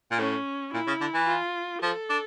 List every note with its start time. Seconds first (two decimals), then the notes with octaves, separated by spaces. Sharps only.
0.11 A#2
0.19 A2 C#4
0.74 A#2 E4
0.87 C#3
1.01 D3
1.14 E3
1.27 F4
1.82 F3 A4
2.09 D4